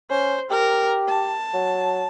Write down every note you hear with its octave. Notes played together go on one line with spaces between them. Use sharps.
C#4 C5
G4 A#4
A5
F#3